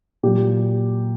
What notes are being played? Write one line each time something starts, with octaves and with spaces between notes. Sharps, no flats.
A#2 F#3 G4